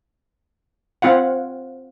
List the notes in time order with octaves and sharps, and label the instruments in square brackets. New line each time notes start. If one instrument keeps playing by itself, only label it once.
[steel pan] C4 F4 F5 F#5